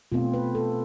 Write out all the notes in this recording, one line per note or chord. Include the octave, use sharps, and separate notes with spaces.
B2 A3 C4 F4
B4
A4